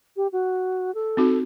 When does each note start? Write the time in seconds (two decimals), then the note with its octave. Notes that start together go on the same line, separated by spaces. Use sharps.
0.16 G4
0.32 F#4
0.94 A4
1.17 C4 D#4 F#4